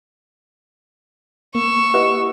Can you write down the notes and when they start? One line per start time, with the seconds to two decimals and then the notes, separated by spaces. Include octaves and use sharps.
1.55 A#3 C#6 E6
1.94 E4 G4 B4 D#5 F#5